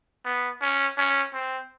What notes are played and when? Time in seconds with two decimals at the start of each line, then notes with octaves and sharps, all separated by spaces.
0.25 B3
0.61 C#4
0.97 C#4
1.33 C4